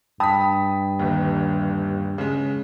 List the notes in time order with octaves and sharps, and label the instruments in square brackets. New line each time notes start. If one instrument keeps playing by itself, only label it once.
[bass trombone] G2 [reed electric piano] G5 A5 B5 [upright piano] D#6 B6
[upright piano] G1 D#2
[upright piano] C#3 G#3 [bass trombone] C#4